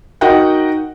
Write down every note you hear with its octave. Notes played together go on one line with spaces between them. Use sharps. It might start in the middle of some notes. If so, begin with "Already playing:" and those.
D#4 F#4 A#4 D#5 F#5 G5